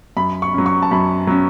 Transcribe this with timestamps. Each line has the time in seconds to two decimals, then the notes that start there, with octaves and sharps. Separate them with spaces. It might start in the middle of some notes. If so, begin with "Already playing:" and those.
0.17 F#2 B5
0.42 C#6
0.54 F#3 C#4
0.66 C#6
0.82 A5
0.91 F#2 B5
1.27 F#3 C#4